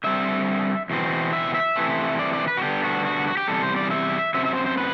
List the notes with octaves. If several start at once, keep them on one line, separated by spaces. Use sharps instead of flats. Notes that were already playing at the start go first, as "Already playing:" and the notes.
D3 G3 C4 E5
E2 B2 C4
E5
E5
C3 E3 A3 C4
D5
D5
B4
F#4
D3 G3 B3 D4 G4
F#4
F#4
F#4
G4
E2 C3 G3 A4
C5
D5
E5
F#2 F#3 C4 E5
E5
C5
C5
B4